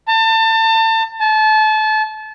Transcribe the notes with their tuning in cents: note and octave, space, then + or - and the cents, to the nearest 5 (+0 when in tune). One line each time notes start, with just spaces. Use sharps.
A5 +30
A5 -30